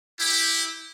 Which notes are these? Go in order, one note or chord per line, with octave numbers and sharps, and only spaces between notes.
E4 G4